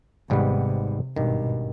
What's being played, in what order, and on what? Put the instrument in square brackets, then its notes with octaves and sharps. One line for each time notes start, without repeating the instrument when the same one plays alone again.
[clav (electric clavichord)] G#1 G#2 G3 B3 [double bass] C3
[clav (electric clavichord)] G#1 G2 D#3 [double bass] B2